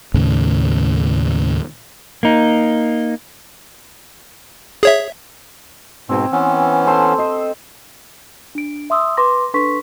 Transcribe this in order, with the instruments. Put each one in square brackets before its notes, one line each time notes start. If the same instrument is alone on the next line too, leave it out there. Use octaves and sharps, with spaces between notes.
[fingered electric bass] D#2 A2 C#3
[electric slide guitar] A#3 D#4
[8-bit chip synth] G#4 C#5 E5
[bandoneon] G#2 B2 [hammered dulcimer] C4 G#5
[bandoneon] E3 B3 C#4
[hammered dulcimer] A4 C5 C6
C5 D#5
[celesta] D4 D7
E5 C6 D#6 E6
B4 C6 D6 A#6
D4 A4 B4 C6 C#6 B6